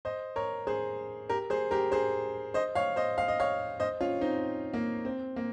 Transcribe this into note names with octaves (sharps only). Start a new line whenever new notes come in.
C5 D#5
A#4 C#5
G#4 C5
G4 A#4
G#4 C5
G4 A#4
G#4 C5
C5 D#5
C#5 F5
C5 D#5
F5
D#5
C#5 F5
C5 D#5
C#4 F4
C4 D#4
A#3
C4
A#3